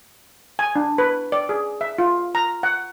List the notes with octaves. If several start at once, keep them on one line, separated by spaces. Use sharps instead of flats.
G#5
D4
B4
D5
G#4
E5
F4
A#5
F#5